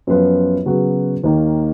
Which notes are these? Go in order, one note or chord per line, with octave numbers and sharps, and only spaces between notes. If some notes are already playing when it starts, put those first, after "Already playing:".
F#2 F3 B3 F4 B4
C#3 F#3 B3 F#4
D#2 D#3 A#3